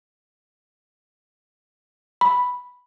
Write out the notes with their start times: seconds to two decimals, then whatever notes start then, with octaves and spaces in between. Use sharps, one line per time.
2.21 B5